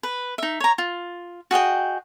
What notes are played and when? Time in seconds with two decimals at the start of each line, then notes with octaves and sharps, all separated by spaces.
0.03 B4
0.38 D#4 E5
0.60 C#5 A#5
0.78 F4
1.51 F#4 G#4 D#5 G5